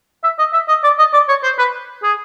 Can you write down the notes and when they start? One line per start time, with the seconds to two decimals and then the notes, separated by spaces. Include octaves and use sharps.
0.24 E5
0.39 D#5
0.53 E5
0.69 D#5
0.84 D5
0.99 D#5
1.13 D5
1.29 C#5
1.43 C5
1.59 B4
2.03 G#4